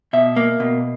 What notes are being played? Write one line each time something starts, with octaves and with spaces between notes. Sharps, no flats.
B2 E5
A#3
B2